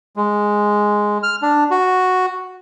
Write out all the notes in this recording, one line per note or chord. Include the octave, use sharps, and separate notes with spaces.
G#3
F6
D4
F#4